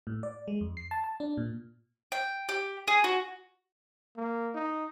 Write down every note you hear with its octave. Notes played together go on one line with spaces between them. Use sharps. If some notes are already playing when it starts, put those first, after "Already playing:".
A2
D5
G#3
F2
C7
A5
A5
D4
A#2
G5
G4
G#4
F#4
A#3
D#4